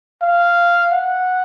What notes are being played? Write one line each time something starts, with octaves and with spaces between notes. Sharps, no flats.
F5
F#5